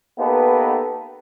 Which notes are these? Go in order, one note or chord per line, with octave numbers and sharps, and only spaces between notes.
A#3 B3 D#4 G4 A4 B4